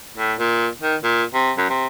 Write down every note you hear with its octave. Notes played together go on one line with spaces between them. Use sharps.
A2
A#2
D#3
A#2
C3
F#2
C3